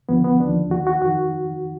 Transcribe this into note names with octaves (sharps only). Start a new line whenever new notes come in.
D#2 D3 F3 B3
B3
D#2 D3 F3 D4
D#2 D#3 F#4
F#4
F2 D#3 F#4